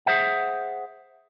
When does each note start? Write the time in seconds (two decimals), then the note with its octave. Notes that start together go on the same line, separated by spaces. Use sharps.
0.06 G#4 A#4 C5 E5 F#5